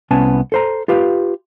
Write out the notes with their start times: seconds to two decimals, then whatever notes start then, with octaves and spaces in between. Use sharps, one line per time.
0.11 C2 B3 C#4 G#5 A5
0.52 A4 C5 A#5
0.88 F4 G4 B4 F5